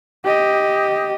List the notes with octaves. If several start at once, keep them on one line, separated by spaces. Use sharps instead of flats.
G4 D#5